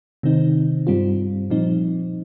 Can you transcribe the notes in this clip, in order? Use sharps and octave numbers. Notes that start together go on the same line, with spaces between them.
C3 D#3 C4 D#4
G2 G3 C4 F4
A#2 F3 C4 D#4